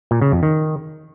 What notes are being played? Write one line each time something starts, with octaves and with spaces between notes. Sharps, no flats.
A#2
C#3
F2
D#3